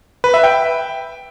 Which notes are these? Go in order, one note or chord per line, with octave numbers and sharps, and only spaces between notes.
B4
E5
G5